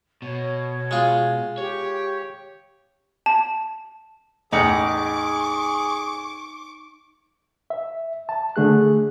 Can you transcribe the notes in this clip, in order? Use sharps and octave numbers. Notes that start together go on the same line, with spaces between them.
B2 C#5
G#3 F4
G4 C#5
A5
A1 E2 D#4 G#4 F#5 G#5 C#6 D6
E5
A5
D3 A3 G#4 F#6